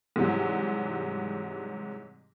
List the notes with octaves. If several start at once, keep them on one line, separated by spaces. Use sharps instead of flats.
G#2 C3 E3 F#3 G3